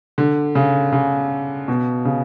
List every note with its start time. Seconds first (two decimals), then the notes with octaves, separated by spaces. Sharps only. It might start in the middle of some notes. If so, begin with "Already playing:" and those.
0.18 D3
0.55 C#3
0.92 C#3
1.68 B2
2.05 C#3